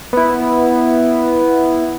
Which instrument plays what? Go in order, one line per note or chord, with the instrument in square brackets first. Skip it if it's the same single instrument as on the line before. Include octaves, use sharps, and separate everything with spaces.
[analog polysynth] B3 E4